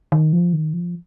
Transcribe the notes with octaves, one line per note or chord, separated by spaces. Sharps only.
D#3
F3
D#3
F3